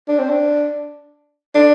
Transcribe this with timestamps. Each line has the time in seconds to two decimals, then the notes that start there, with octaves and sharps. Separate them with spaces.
0.08 D4
0.19 C4
0.29 D4
1.55 D4